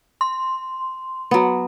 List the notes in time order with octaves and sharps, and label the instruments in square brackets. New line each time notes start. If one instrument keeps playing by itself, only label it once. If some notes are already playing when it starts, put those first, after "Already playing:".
[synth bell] C6
[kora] F#3 B3